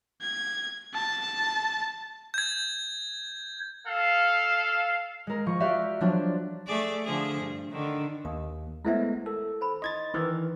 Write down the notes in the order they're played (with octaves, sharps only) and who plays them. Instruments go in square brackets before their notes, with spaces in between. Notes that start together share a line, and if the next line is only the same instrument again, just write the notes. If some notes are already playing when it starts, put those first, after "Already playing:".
[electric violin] G#6
A5
[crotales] G6 G#6
[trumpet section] A4 F5
[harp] G#3 A#4
F3 C#6
F#4 G4 D5 E5 F5
F3 F#3 D4
[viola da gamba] A3 G#4 D5
D3 F3 G#4
G2
D3 D#3
[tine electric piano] D#2 [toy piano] D#6
[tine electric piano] G#3 A3 B3 [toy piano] E4 C5 E5
[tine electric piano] A4 [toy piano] A#4
[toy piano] C5 B5
[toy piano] D#4 C6 [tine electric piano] D#5 G#6 A6
[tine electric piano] D#3 E3 [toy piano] G#4 B4 D5